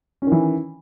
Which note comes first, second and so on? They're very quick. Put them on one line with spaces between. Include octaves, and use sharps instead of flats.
C#4 D#3 E3